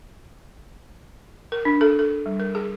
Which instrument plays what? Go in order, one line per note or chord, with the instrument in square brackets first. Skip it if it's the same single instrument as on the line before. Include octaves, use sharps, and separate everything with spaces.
[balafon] A#4
D4
A4
A4
G3
A#4
G#4